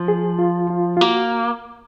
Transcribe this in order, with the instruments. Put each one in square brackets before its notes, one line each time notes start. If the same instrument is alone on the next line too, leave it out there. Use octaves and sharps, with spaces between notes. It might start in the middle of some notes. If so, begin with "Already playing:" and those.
Already playing: [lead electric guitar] F3
[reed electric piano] G#4
F4
F4
F4
[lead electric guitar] A#3 [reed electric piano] F#4